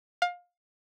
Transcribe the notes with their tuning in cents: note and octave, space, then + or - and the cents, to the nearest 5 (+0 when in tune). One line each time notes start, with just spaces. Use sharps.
F5 +25